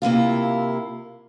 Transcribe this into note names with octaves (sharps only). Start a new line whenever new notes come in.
C3 A#3 E4 F4